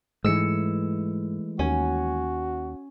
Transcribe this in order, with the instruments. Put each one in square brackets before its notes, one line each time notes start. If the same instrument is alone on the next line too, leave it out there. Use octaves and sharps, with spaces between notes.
[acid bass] G#2 [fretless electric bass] E3 G#3 A3 [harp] E6 C#7
[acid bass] D#2 [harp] C#4 [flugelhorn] F#4